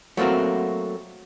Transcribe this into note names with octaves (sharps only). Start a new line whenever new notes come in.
F#3 A3 A#3 C4 F#4